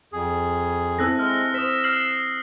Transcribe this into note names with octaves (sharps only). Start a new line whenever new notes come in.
F2 G#4
C4 E4 A4 E6 F#6 A#6
G#3 F6
C5 D#6 E6 B6
F6 C7 F#7